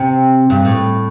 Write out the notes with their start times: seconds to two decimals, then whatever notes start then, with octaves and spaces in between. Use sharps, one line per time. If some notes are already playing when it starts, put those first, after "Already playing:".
Already playing: C3
0.50 G2
0.65 A2